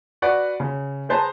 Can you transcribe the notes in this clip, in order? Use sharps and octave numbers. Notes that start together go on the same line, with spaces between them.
F#4 B4 D5 F#5 C#6
C#3
G#4 B4 C5 A5 A#5